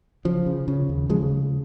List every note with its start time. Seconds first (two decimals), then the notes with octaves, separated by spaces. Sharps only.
0.25 C#3 F3
0.46 C#3
0.68 C#3
0.89 D#2
1.10 C#3 F3 G#3